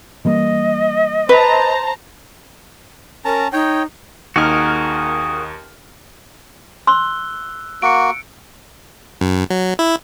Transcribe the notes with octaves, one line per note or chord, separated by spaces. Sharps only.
E3 G3 A#3 D#5
B4 C5 A5 A#5
C#4 A#4 A5 A#5
D#4 C#5 G5
D#2 D#4 F#4 G#4 A#4 F6
C6 E6 F#6 G7
A#3 F#4 C#7 D7
F#2
F#3
E4